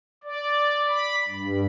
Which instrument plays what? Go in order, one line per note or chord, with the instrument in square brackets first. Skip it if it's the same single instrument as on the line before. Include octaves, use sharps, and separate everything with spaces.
[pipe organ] D5
B5
G2